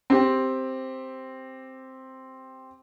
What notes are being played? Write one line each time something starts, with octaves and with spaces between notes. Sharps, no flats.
C4 G4